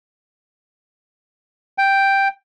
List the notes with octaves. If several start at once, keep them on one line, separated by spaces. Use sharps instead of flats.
G5